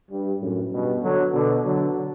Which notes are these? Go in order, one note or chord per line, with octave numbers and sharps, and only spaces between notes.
G2
F#2 A2
G2 B2
D3 F#3
B2 D3
D3 F#3